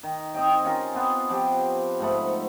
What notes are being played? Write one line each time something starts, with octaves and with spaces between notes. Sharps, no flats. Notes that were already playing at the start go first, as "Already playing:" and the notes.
D#3
C4 D#5 G5
C#4 F4 A#4 G#5
B3 C4 F4
F3 G4
G#2 A3 B5